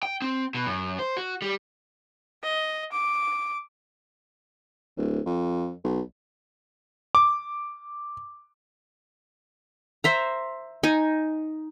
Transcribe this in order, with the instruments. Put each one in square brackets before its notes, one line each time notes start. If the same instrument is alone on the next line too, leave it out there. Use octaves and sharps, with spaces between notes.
[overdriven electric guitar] G5
C4
B2
F#2
C5
F#4
G3
[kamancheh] D#5
D6
[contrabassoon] D1
F2
B1
[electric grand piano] D6
[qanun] C5 E5 A#5
D#4 G#5